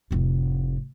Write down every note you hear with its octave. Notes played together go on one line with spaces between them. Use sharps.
F1 A2